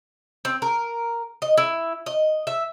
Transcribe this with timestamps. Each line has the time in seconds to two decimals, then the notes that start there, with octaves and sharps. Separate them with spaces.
0.45 C4
0.62 A#4
1.42 D#5
1.57 E4
2.06 D#5
2.47 E5